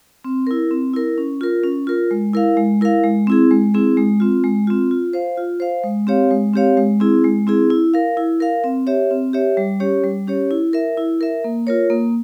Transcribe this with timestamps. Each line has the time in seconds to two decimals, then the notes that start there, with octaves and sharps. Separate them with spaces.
0.24 C4
0.47 E4 A#4
0.71 C4
0.93 E4 A#4
1.18 C#4
1.41 F4 A#4
1.64 C#4
1.87 F4 A#4
2.11 G#3
2.33 E4 A#4 F5
2.57 G#3
2.81 E4 A#4 F5
3.04 G#3
3.27 C4 E4 G#4
3.51 G#3
3.74 C4 E4 G#4
3.97 G#3
4.20 C4 F4
4.44 G#3
4.67 C4 F4
4.91 F4
5.13 C5 F5
5.37 F4
5.60 C5 F5
5.83 G#3
6.07 C4 G4 C#5 F5
6.31 G#3
6.54 C4 G4 C#5 F5
6.77 G#3
7.00 C4 E4 G#4
7.24 G#3
7.47 C4 E4 G#4
7.70 E4
7.94 A#4 F5
8.17 E4
8.40 A#4 F5
8.64 C4
8.87 G4 C#5 E5
9.11 C4
9.33 G4 C#5 E5
9.57 G3
9.80 C#4 G4 C#5
10.04 G3
10.28 C#4 G4 C#5
10.51 E4
10.73 A#4 E5
10.97 E4
11.21 A#4 E5
11.44 A#3
11.67 F4 A#4 C#5
11.90 A#3